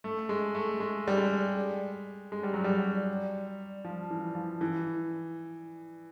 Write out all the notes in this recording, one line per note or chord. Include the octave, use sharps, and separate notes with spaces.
A3
G#3
A3
G#3
G3
G#3
G#3
G3
F#3
G3
F3
E3
F3
E3